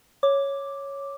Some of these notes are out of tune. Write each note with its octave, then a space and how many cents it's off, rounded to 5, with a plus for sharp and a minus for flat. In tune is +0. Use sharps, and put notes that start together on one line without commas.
C#5 +0 D6 +0